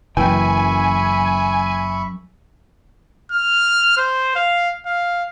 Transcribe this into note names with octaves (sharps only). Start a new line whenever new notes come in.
F#1 F#2 E3 E5 G5 G#5 B5 C#6
F6
C5
F5
F5